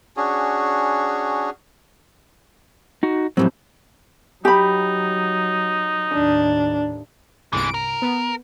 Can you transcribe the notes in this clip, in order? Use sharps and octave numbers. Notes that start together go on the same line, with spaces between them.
C#4 D4 F#4 G#4
D#4 F#4
F2 A2 F#3 G3 C4
F#3 D#4 G4 B5
D#2 A2 D4
G1 C2 E3 G#3 D7
A#4
B3